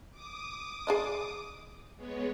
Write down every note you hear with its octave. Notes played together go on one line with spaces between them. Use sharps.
D6 D#6
G#4 D5 D#5
G#3 B3 C#5